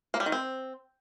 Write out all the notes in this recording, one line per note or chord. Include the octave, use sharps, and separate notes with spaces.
A#3
G3
D#3
C4